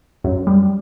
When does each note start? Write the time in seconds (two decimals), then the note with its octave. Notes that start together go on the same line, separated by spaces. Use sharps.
0.24 F#2
0.47 G3